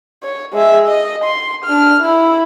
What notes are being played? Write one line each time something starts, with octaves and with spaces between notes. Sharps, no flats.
C#5
G#3 E5
D#5
C6
D4 F6
E4